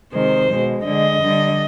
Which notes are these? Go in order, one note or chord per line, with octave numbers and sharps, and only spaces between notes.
C3 D#3 G#3 C5
B2 G#3
D3 G#3 D#5
D3 G3